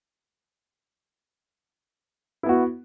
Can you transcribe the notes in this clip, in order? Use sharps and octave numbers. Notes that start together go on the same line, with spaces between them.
B3 E4 F#4